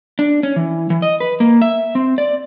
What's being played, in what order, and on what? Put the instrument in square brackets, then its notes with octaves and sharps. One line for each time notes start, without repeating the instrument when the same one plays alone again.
[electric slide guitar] D4
C#4
E3
E3
D#5
B4
A#3
E5
C4
D5